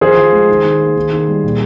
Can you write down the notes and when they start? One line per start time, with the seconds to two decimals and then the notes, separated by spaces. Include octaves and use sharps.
0.01 F3 G#4 C5
0.17 F3
0.32 G#3
0.49 D#3
0.64 D#3
0.80 A#3
0.96 D#3
1.12 D#3
1.28 G3
1.44 A#2